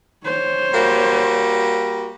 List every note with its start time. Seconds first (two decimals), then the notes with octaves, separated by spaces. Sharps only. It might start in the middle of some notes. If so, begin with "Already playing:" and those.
0.25 C5 C#5
0.73 G3 A#3 F#4